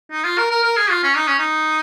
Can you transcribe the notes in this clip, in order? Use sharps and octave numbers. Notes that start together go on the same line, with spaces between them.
D#4
F4
A#4
A#4
A#4
G#4
F4
C#4
D#4
C#4
D#4